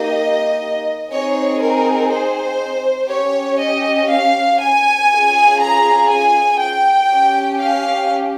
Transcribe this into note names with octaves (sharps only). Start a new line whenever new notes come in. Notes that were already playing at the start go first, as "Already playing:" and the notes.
Already playing: A#3 D#4 G4 D#5
C4 D#4 G#4 C#5
A#4
C5
C#4 G4 C#5
D#5
F5
G#5
C#4 F4 G#4
A#5
G#5
G5
C#4 G4
F5